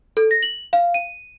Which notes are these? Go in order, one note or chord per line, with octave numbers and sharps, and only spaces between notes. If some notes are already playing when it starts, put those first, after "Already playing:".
A4
A#6
F#7
F5
D#7